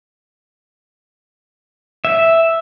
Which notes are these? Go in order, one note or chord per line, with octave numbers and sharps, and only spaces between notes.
E5